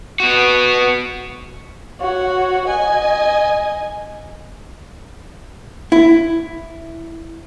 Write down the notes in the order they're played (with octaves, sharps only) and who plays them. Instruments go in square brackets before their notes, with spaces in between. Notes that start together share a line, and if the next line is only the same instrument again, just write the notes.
[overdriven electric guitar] B3 F#4
[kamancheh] F#4 C#5
D#5 G#5
[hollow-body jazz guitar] E4